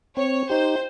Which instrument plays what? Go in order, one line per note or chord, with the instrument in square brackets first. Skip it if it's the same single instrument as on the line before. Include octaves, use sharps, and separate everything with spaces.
[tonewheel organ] C4 [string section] C#5
[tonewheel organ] D#4 G4 [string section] C5